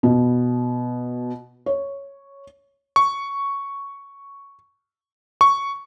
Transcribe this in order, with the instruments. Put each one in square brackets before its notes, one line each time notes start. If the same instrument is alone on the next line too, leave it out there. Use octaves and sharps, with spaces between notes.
[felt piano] B2
C#5
[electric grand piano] C#6
C#6